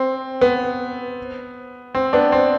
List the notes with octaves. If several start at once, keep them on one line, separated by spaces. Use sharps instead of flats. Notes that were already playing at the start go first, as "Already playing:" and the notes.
Already playing: C4
B3
C4
B3 D4
C4